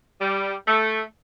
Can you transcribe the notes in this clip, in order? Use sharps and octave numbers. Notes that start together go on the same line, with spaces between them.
G3
A3